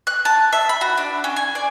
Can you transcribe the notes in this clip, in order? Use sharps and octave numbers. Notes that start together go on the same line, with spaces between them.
F#6
A5
E5
B5
F#4
D4
C#4
G#5
D5